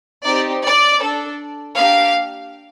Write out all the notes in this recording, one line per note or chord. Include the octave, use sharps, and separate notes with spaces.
C4 D#4 G4 D5
D5
D4 A4
A#3 D4 G4 F5